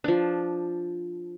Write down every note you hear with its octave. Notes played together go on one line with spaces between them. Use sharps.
F3 D4